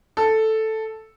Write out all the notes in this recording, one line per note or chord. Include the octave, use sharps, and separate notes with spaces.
A4